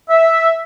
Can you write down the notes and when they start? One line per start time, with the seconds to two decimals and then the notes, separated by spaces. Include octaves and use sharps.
0.09 E5